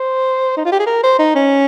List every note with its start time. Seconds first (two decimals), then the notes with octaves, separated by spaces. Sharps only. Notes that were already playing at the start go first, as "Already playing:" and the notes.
Already playing: C5
0.57 D#4
0.65 F4
0.72 G4
0.79 G#4
0.86 A#4
1.03 C5
1.19 D#4
1.35 C#4